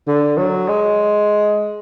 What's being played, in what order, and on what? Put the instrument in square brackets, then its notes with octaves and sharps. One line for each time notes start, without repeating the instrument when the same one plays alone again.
[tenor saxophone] D3
F#3
G#3